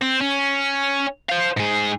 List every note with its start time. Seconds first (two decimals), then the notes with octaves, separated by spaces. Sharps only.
0.01 C4
0.21 C#4
1.29 C5 F5
1.57 G#2 G#4